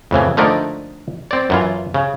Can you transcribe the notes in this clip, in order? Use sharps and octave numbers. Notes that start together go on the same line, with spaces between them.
F2 A2 C#3 E3
D3 F3 A3 A#3 D#4 D5
C4 D5
F#2 E3 F4
C#3